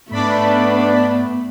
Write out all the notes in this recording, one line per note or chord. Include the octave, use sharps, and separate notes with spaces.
G#2 A3 B3 D4 D5 B5